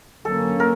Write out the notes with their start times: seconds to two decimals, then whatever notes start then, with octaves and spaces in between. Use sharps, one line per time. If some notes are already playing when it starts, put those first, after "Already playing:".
0.24 D3 F#3 A#3 C#4 A4
0.60 A#4